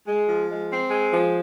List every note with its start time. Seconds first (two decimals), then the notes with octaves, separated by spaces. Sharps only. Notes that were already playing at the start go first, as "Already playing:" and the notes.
0.07 G#3
0.29 F3
0.50 G#3
0.69 C4
0.91 G#3
1.12 F3